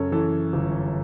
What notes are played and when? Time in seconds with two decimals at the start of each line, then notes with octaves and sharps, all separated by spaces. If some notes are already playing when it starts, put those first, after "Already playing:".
Already playing: F#2 C#3 A4 C#5
0.12 E3 A4
0.53 G1